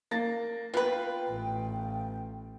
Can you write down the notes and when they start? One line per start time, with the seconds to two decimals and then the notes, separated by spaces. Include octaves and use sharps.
0.11 A#3 A6 A#6
0.74 B3 F4 B4 F5 G5
1.29 A1